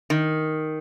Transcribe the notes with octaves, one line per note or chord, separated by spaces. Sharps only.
D#3